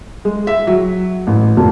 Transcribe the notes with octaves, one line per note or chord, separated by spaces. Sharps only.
G#3
E5
F#3
A1
F1